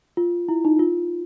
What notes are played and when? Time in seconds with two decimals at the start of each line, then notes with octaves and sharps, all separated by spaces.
0.17 F4
0.49 E4
0.65 D#4
0.79 F4